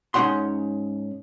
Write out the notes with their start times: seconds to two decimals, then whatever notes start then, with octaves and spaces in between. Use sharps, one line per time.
0.14 G#2 C#4 D#4 C#5 F#5 C6